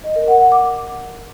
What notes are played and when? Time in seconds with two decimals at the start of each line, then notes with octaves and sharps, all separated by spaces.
0.04 D#5
0.16 A#4
0.28 F#5
0.40 F#5
0.52 D6